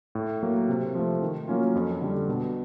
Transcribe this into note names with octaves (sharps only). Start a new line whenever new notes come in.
A2
F#3 A#3
C3
F3 A3
D#3
F#3 A#3 C#4 F4
F2
D3 G3
B2